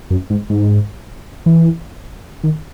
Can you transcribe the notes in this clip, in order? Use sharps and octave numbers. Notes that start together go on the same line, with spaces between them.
F#2
G#2
G#2
E3
D#3